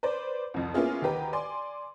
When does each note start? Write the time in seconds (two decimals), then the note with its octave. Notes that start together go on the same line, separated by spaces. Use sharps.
0.03 B4 C5 D5
0.54 C2 F2
0.74 A#3 B3 C#4 E4 F4 G#4
1.02 D2 D#3 G4 B4 A#5
1.33 D5 G#5 C6 D6